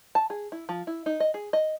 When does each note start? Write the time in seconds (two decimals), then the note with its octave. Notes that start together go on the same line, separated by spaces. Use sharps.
0.15 A5
0.30 G#4
0.52 E4
0.69 F3
0.87 E4
1.06 D#4
1.20 D#5
1.34 G#4
1.53 D#5